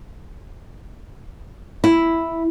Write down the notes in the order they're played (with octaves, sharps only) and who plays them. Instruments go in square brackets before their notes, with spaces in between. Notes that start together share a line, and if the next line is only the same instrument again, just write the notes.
[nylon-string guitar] E4